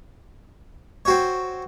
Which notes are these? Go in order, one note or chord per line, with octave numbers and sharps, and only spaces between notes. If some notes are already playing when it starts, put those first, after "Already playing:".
C4 F#4 C#5